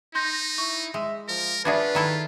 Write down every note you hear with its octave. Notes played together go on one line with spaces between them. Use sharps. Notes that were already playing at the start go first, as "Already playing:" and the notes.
D#4 C6 G6 A#6
E4 C#6
G#3 E5
F3 A#4
D4 F4 F#4 G#4 B4 D5 E5 G#6
D#3 E4 A4